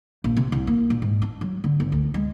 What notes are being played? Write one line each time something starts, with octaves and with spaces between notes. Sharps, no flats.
A#1
C3
C2
A#3
A#1
G#2
D4
F#3
D3
G1
D2
G#3